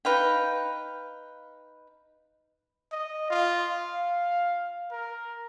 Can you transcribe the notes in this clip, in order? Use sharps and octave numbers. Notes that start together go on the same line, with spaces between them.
D#4 B4 F5 G5
D#5
F4
F5
A#4